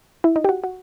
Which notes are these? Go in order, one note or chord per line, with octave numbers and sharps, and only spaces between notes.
E4
D#4
G4
F#4
F#4